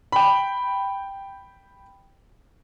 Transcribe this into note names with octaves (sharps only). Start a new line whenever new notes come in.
G5 B5